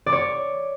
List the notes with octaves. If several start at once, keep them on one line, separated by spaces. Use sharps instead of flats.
C#5 D5 C#6 D6